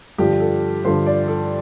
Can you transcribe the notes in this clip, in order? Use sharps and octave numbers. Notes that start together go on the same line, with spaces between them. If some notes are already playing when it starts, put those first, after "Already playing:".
G2 D3 F3 G4
A4
G2 D3 F3 C5
D5
A4